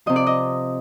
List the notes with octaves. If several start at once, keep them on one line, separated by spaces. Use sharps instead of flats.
C3 F3 D#5
D5
D#5